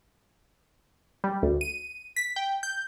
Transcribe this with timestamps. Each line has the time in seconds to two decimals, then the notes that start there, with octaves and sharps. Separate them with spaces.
1.24 G3
1.43 D2
1.61 D#7
2.16 B6
2.36 G5
2.63 G6